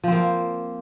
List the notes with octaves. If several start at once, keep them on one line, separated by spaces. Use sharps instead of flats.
F3 A#3 C4